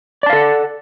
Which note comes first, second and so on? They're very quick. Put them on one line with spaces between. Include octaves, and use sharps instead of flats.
D5 A5 F5 A4 F#5